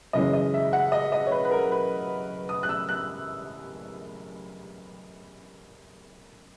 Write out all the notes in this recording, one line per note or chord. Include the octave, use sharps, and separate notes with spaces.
F#2 C#3 E3 G#3 C#4 D#5
D#5
E5
F#5
D#5
D#5
C#5
B4
B4
A#4
B4
D#6
F#6
E6
F#6